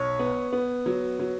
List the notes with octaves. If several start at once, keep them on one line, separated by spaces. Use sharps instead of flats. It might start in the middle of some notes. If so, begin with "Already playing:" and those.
Already playing: B1 C#5
B3
B3
F#3
F#3